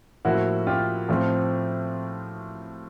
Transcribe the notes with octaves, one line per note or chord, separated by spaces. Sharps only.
A2 F3 A#3 E4 F#4
F4 G4
A2 F3 A3 C4